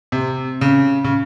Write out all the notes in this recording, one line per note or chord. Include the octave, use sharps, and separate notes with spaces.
C3
C#3
C#3